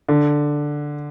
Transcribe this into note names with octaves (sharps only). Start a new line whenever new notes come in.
D3